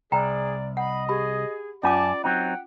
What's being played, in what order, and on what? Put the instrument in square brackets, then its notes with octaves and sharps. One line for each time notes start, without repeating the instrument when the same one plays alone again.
[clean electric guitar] C2 [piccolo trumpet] G#4 [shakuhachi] D5 [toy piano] G5 A#5
[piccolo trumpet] D#5 [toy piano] F#5 [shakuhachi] B5
[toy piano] G4 B5 [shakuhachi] G#4
[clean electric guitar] F#2 G#5 [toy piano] C#4 F4 D6 [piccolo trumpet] D5 [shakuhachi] A5
[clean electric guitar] F#3 C4 D#4 [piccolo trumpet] F#5 [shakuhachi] G5